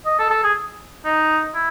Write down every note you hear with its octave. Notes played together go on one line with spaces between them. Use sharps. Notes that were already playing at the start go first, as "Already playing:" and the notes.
D#5
A4
A4
G#4
D#4
E4